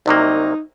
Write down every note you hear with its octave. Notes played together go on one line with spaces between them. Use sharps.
C2 C3 F#3 A#3 D#4